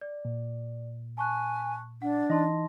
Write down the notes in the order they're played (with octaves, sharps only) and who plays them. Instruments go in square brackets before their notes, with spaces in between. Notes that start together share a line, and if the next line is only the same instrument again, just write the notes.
[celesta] D5
[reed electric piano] A#2
[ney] G#5 [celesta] A5 C#6 F#6
[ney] D4 [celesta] F#5
[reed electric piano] E3 D#4 D#5 [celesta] A5 C6 A#6